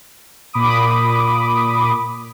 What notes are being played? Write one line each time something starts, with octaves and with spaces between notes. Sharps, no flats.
A#2 B5 D6 D#6